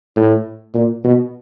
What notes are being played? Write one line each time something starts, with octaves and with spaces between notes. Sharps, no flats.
A2
A#2
B2